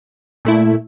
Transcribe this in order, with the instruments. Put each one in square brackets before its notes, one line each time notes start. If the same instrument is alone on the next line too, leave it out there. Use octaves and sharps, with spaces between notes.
[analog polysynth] A#2 A3 E4